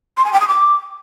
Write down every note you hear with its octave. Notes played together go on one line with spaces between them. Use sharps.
C6
G#5
G5
D#6
D6